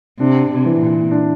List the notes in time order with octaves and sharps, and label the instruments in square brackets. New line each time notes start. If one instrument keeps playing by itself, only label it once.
[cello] C3 [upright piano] D4
[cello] C3
[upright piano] E3
[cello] A#2
[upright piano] D4